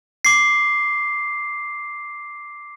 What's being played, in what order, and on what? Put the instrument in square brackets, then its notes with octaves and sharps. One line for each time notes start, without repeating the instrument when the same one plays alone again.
[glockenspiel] D6 C7